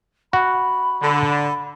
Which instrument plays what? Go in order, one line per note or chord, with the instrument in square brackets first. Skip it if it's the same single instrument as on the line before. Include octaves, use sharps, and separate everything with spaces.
[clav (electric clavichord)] F#4 [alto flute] B5
[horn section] D3